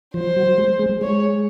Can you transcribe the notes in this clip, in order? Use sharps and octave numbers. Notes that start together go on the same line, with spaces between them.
F3 C5
F#3
G#3
G#3
G#3 C#5